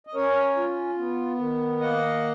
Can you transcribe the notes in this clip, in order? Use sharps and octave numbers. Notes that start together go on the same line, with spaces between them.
D#5
C#4 A#4 C#5
F4
B3
D#3
A#3 D#5 F#5